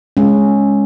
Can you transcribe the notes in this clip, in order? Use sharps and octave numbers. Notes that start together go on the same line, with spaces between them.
G#3 C#4